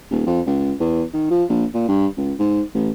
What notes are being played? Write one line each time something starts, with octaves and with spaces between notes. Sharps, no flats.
D#1
F2
C#2
E2
D#3
F3
A#1
A#2
G2
C#2
G#2
A1